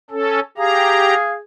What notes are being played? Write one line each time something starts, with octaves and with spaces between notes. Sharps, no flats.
C#4 A4
G4 G#4 F5 A#5